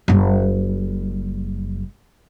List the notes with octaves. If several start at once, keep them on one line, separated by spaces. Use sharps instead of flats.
F#1 G3